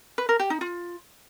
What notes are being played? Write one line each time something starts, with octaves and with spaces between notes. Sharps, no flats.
B4
A#4
G4
D#4
F4